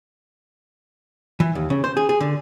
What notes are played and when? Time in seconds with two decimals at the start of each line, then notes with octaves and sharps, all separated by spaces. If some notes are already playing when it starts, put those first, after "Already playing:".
1.40 E3
1.55 D#2
1.70 C#3
1.84 C5
1.97 G#4
2.09 G#4
2.20 D3